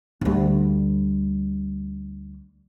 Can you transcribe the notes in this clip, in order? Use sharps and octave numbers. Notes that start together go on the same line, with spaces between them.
D2 G3